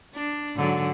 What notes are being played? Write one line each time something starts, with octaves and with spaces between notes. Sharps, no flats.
D4
G#2 D3 F#3